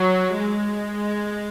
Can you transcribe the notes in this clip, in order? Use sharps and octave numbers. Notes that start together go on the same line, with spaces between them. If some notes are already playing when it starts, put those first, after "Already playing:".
Already playing: F#3
G#3